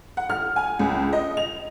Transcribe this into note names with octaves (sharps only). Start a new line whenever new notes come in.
F#5
F6
G#5
C#2
D#5
F7